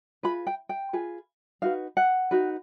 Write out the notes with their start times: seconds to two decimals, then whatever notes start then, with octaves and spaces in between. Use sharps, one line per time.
0.23 F4 G#4 B4 B5
0.47 G5
0.69 G5
0.93 F4 G#4 B4
1.62 D#4 F#4 B4 F5
1.97 F#5
2.31 D#4 F#4 B4